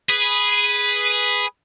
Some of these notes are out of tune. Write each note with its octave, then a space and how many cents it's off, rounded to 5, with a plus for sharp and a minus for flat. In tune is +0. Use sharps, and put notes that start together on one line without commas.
G#4 +0 B4 +0